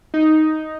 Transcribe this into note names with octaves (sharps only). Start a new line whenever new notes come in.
D#4